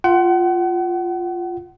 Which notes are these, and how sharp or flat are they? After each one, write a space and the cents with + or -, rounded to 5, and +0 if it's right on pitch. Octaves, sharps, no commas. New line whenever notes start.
F4 +0 F#5 +35